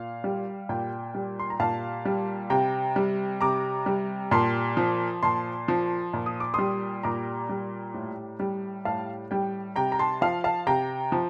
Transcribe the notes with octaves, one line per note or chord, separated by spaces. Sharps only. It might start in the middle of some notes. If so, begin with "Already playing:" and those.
Already playing: A#2 F5
G3
A#2 G5
G3
C6
A#5
A#2 F5 A5
G3
C3 G5 A#5
G3
C3 A#5 D6
G3
A#2 A5 C6
F3
A#2 A5 C6
F3
A#2
D#6
D6
G3 C6 D#6
A#2 A#5 D6
G3
A2
G3
A2 F5 A5
G3 G5
C3 G5 A#5
A#5
A5 C6
F3 F5 A5
F5 A5
C3 G5 A#5
F3